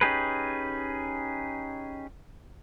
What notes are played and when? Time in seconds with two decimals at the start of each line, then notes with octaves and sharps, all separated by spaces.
0.01 C#4 D#4 G4 G#4 B4